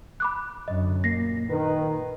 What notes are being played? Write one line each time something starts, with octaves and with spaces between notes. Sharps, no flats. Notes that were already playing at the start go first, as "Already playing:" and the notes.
B5 D6 F#6
F#2 D3 D#5
A#2 A#3 A#6 C7
D#3 B4